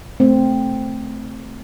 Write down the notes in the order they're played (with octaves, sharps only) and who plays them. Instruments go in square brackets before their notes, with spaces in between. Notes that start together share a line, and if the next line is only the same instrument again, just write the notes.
[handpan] A3 C4